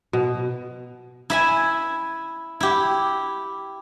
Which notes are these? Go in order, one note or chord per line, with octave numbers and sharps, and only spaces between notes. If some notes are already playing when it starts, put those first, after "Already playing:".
B2
E4 E5 G#5
E4 G4